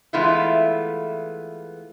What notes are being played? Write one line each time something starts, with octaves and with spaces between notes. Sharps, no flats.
E3 G#3 A3 B3 E4 F4